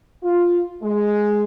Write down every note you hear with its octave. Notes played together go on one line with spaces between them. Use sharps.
F4
G#3